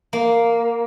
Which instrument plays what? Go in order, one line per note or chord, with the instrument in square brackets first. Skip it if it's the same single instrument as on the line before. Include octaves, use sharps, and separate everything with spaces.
[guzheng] A#3